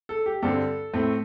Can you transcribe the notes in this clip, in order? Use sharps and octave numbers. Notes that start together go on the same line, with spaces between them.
A4
G4
G2 D3 G3 C4 A4
A2 A3 C4